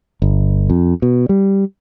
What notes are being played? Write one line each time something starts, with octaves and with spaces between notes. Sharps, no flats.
G1
F2
B2
G3